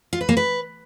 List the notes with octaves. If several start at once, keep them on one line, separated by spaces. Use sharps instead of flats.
F4
B4
A#3
B4